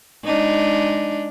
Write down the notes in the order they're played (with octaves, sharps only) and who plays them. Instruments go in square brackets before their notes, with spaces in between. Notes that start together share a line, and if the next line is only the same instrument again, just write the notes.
[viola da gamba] G#3 D4 D#4